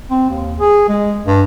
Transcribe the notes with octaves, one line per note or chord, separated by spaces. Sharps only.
C4
D#2
G#4
G#3
G2